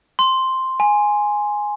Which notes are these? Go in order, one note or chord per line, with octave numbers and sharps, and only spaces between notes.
C6
G#5